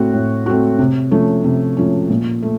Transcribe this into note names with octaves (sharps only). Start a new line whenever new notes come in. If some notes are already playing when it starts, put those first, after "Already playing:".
Already playing: A2 A3 C4 F#4
A2
A3 C4 F#4
C3
F3 A3 C#4
C3
F3 A3 C#4
A#2
A3